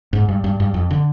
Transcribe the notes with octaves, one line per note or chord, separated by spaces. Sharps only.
G#2
G2
G2
G2
F2
D3